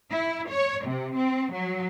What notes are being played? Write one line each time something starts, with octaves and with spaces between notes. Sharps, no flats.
E4
C#5
C3
C4
F#3